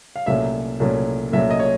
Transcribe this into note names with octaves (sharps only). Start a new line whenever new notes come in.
F5
C2 A#2 F#3 A3 C#4 E5
C2 A#2 F#3 A3 C#4
C2 A#2 F#3 A3 C#4 E5
D#5
C#5